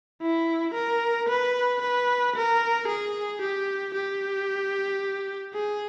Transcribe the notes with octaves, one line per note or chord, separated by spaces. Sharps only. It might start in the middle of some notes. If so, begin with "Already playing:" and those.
E4
A#4
B4
B4
A#4
G#4
G4
G4
G#4